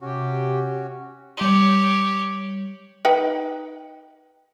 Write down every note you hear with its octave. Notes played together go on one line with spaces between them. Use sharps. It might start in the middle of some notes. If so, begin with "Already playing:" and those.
C3 C#4 F#4 G4
G3 G4 C#5 F#7
D#4 B4 G5